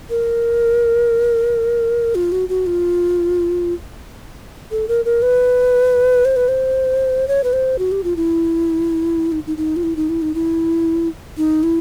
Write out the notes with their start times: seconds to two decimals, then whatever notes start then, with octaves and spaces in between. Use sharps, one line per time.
0.10 A#4
2.15 F4
2.32 F#4
2.49 F#4
2.67 F4
4.71 A4
4.88 A#4
5.05 A#4
5.22 B4
6.25 C5
6.36 B4
6.48 C5
7.28 C#5
7.44 B4
7.53 C5
7.79 F#4
7.92 G4
8.04 F4
8.16 E4
9.32 D#4
9.47 D#4
9.57 D#4
9.76 F4
9.83 E4
9.96 D#4
10.09 E4
10.22 D#4
10.35 E4
11.38 D#4
11.63 E4